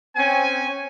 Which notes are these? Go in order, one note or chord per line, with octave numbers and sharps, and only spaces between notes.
C4 C#4 G#5